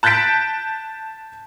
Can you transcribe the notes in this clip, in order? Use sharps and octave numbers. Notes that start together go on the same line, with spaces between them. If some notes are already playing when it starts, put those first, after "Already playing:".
A5 F#6 G6 A6 B6 D7